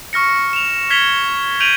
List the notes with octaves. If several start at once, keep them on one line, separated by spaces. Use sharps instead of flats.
C#6 F6 A#6 C#7
E7 F7
F6 G#6 B6 C#7 F7 G7
G6 D7 D#7 F7 F#7